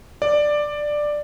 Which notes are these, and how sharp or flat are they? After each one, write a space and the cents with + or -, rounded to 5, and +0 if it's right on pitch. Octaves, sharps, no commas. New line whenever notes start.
D5 +10